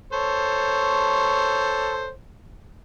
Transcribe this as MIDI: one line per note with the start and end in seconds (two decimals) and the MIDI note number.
0.13 2.11 69
0.13 2.11 72
0.13 2.11 73